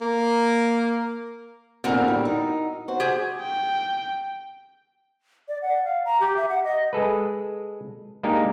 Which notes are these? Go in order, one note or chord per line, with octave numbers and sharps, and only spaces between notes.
A#3
E2 A#2 D3 C4 F#4 A#4
G3
D#4
F#4 C5
G4 G#4
G5
D5
F#5
F5
A#5
G4
E5
F#5
D#5
G#3 G#4 A4 B4
G#3 A#3 D4 D#4 G4 A#4